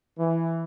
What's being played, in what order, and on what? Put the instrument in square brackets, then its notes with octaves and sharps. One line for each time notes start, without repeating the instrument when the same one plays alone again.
[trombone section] E3